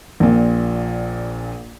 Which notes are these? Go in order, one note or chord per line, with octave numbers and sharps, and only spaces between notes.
A#1 A#2